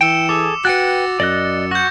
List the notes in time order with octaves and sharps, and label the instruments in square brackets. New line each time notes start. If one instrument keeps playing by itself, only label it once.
[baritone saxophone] E3 [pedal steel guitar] G5 [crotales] E6 C#7 E7
[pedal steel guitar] G#4 A4 [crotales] D6
[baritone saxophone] F#4 [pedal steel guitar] B4 G5 F#6 [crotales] A6 C#7
[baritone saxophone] F#2 [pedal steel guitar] D5 D#5 F#6
[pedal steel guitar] F#4 [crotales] G6 A#6